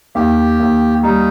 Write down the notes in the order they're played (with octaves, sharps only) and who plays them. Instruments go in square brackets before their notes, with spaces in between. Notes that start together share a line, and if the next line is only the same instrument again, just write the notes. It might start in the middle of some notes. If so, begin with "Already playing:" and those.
[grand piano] D#2 [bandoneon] G4
[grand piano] D#2
[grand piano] G3 [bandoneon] D#4